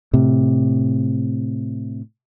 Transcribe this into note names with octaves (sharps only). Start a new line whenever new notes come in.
A2 C3